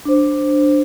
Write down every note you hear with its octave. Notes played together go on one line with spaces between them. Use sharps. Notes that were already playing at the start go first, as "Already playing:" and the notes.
D4 C5